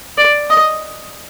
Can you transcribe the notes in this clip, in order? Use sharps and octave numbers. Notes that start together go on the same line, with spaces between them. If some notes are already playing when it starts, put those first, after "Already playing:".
D5
D#5